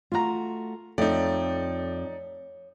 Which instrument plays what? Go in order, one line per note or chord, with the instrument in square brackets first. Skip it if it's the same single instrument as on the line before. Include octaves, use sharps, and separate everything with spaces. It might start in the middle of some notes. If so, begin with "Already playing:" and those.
[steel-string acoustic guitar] A3 F#4 [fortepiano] F4 A#5
[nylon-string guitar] F2 [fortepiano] A3 [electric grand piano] D#4 D5 [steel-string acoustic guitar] C#5